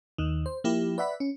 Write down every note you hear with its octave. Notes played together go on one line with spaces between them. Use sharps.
D#2 D#3
C5
F3 A#3 E4 G4
B4 D5 E5 F#5 B5
C#4